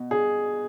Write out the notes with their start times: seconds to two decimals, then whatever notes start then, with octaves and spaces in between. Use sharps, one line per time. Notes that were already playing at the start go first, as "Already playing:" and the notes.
Already playing: B2
0.11 G#4